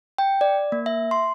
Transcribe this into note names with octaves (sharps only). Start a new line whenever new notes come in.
G5
D5
A#3
E5
C6